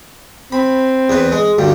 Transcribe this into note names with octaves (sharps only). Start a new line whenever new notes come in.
C4 B5
E2 B4
G#3
D2 G2 G4